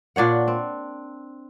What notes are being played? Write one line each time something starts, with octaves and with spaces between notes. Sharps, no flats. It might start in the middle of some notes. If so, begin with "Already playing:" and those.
A#2 D4 C#5 F#5
C4